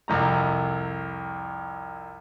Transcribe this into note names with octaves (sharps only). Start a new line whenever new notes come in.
C2 F2 A#5